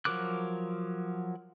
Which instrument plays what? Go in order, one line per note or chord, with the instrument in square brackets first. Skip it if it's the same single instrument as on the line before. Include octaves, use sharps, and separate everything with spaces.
[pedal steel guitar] F3 F#3 A#4 D6 F#6